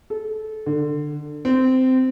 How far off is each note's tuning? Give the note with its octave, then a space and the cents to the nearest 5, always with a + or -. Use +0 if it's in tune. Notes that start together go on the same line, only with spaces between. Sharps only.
A4 -20
D3 +20
C4 -15